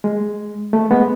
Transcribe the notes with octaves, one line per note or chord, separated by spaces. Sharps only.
G#3
A3
G#3 B3